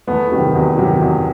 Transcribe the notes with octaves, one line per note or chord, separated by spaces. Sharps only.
E2 A3 B3
C3 D#3 F#3
E2
C3 D#3 F#3
E2